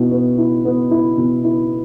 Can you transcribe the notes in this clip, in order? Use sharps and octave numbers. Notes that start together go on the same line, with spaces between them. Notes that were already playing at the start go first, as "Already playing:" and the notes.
Already playing: B2 E4
B3
E4
B3
E4
B2
E4